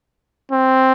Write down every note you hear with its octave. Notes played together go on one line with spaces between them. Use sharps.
C4